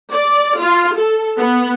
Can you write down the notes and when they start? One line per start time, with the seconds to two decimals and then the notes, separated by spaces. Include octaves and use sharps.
0.11 D5
0.60 F4
0.97 A4
1.38 B3